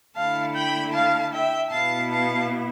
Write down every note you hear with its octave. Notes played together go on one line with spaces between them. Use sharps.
D3 A3 E4 F5 A5
G5 B5
F5 A5
E5 G5
B2 B3 E4 F5 A5
F5 A5